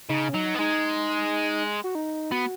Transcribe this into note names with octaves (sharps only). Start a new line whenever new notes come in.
C#3 D#4
C#4
F#3 D#4
B3
G#3 D#4
F#4
D#4
B3 F#4